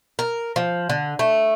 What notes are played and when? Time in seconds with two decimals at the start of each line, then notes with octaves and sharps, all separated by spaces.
0.19 A#4
0.56 F3
0.90 D3
1.19 A3